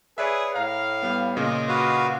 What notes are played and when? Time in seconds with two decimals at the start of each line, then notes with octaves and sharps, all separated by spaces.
0.18 G#4 B4 C#5 D5 E5
0.56 A2 F5 A#5
1.03 G3 B3
1.37 A#2 C#3 F4 D#5
1.68 F#4 B4 F5